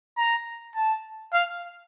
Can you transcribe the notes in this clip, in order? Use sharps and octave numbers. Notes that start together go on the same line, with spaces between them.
A#5
A5
F5